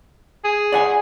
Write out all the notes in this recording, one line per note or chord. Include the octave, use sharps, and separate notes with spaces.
G#4
D5 F#5 G#5